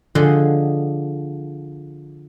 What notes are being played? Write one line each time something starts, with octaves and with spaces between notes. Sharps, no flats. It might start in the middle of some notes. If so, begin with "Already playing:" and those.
D3 F3 G#4 D#5 F#5 C6